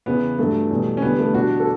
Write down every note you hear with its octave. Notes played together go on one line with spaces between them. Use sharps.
E2 C#3 E3 B3
G2 F#3 A3
E2 B2 G3
C#4
E2 D3 G3 B3
A3
E2 B2 G3 D4 F#4
A4